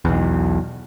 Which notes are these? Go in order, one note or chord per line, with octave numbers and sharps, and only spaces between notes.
B1 E2